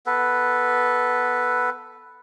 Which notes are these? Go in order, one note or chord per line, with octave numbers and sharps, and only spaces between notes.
B3 A4 B4